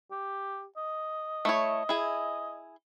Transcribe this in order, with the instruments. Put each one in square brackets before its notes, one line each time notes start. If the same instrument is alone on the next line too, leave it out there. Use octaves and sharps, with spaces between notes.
[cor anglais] G4
D#5
[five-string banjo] A3 E4 C#5
E4 G#4